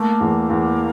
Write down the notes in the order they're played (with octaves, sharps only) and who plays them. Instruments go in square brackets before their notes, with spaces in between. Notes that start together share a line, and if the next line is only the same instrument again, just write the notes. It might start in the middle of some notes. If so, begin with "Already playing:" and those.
Already playing: [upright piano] A3 [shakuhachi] A#3
[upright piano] E2
E2